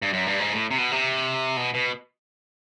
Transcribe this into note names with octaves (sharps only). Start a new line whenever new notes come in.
G2
F#2
G2
G#2
A2
C3
B2
C3
B2
B2